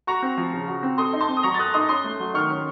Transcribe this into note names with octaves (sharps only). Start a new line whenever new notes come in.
F#4 A#5 C#6
C4
F3
C#3
F#4
C4
A4 C6 D#6
D#4
A5 C6
C4
D#6
F#3 A#5 C#6
A6
A4 D#6 F#6
D#4 C6 D#6
C#4 C6 D#6
A3
F#3
D#3 C#6 F6
C#4